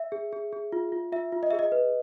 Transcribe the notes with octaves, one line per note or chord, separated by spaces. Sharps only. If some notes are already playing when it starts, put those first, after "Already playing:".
Already playing: E5
G#4
G#4
G#4
F4
F4
F4 E5
F4
D#5
G#4 E5
D#5
B4